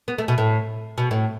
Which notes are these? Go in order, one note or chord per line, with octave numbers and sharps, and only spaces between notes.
B3
A3
B2
A2
B2
A2